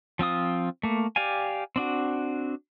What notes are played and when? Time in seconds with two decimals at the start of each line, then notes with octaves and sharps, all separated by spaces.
0.19 F3 C4 F4 D#6
0.83 A3 A#3
1.16 G4 D5 F5 G#5
1.76 C4 D4 F#4